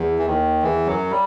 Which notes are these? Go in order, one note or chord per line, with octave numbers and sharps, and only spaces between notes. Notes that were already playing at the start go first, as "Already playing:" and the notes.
Already playing: E2
E3
D#2 D#3
E2 E3
F#2 F#3
G3